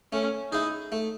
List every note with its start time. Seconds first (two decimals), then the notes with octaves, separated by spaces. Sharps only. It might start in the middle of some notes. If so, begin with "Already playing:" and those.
0.12 A3 C#4
0.52 D#4 E4 G#4
0.92 A3